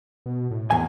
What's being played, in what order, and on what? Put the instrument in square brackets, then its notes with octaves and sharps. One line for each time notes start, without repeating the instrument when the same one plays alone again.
[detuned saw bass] B2
A2
[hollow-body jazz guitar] E2 G#5